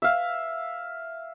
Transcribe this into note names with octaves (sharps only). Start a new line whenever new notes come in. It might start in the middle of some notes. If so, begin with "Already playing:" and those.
E5 F5